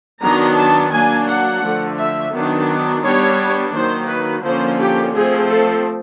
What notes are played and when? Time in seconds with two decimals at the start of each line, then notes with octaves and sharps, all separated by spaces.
0.22 D#3 F#3 B3 D4 A#5
0.57 A5
0.93 F#3 A#3 D4 G#5
1.28 F#5
1.63 D3 F3 A3
1.98 E5
2.34 D#3 F#3 B3 D4
3.03 G3 B3 D4 C#5
3.74 D#3 F#3 A#3 C5
4.09 B4
4.44 D3 F3 A#3 C#4 C5
4.79 G4
5.14 F3 A3 C4 G#4
5.50 A4